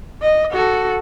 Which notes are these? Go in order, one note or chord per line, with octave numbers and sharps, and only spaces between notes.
D#5
F#4 A4